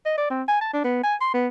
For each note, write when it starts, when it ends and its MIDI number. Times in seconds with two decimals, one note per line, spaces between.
0.06 0.17 75
0.18 0.30 74
0.30 0.43 60
0.48 0.59 80
0.61 0.69 81
0.73 0.82 62
0.84 1.00 59
1.03 1.15 80
1.21 1.30 84
1.34 1.48 59